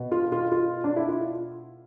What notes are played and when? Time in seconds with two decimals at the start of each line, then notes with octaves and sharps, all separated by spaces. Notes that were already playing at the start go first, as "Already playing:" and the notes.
Already playing: B2
0.12 F4
0.32 F4
0.52 F4
0.84 D4
0.96 E4
1.08 F4